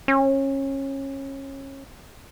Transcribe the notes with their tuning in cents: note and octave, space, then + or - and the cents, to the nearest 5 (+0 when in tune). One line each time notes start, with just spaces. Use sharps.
C#4 -25